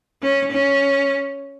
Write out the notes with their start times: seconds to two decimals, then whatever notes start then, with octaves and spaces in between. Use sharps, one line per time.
0.22 C#4
0.52 C#4